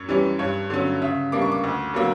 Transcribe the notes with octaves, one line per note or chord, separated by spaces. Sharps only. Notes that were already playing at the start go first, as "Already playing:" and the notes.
Already playing: F#2 C#5
E3 G3 C#4
G2 C#5
D3 F#3 C#4
C#3 E5
G3 A#3 D4 D6
C#6
D6
D2
D3 F#3 A#3